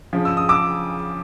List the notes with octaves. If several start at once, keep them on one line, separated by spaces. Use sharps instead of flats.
C#3 F3
E6
D#6
D6 E6